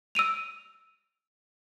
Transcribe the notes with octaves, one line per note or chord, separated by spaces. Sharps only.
E6 D7 D#7 F7